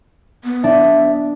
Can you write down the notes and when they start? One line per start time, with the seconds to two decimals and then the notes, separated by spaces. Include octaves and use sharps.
0.44 B3
0.64 D4 E5